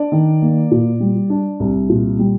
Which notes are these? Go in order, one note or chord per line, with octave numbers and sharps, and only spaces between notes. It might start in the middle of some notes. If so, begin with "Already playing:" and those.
Already playing: D4 D5
D#3
A#3
A#2
G3
D4
C2
A#2
G3